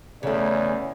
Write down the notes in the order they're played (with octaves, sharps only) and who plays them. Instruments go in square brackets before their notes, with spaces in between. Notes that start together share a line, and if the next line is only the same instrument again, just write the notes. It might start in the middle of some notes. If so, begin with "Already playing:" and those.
[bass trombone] E2 [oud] C#3 A3 [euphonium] C#4 [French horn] D5